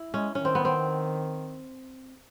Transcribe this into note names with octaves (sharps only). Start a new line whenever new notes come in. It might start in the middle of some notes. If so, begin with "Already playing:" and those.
Already playing: E4
G#3 C#4
D#3 C#4
C4
B3
C4